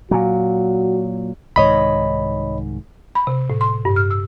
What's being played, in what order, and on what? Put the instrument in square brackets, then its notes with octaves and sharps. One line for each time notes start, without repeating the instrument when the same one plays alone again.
[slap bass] A#2 F#3 [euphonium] F#4
[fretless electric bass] C2 G#2 D#3 [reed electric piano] C#5 D#5 B5
[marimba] B5
C3
A2
C6
G2
F6
E6